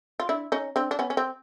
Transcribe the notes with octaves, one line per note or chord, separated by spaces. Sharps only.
F4
D4 E4
C#4 D#4
C4 D4
D4
B3 C#4
C#4
C4